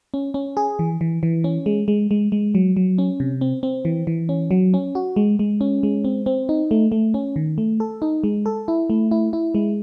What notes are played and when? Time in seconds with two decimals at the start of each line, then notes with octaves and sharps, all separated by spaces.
0.14 C#4
0.34 C#4
0.57 G#4
0.79 E3
1.01 E3
1.23 E3
1.44 C#4
1.66 G#3
1.88 G#3
2.11 G#3
2.32 G#3
2.55 F#3
2.77 F#3
2.98 C#4
3.20 C3
3.41 C4
3.63 C4
3.85 E3
4.07 E3
4.29 C#4
4.51 F#3
4.74 C#4
4.95 F#4
5.16 G#3
5.39 G#3
5.61 C#4
5.83 G#3
6.04 C4
6.26 C4
6.49 D#4
6.71 A3
6.92 A3
7.14 C#4
7.36 D#3
7.58 A3
7.80 A4
8.02 D#4
8.24 G#3
8.46 A4
8.68 E4
8.90 A3
9.11 E4
9.33 E4
9.55 G#3